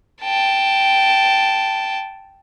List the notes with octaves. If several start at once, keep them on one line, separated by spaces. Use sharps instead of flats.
G5 A5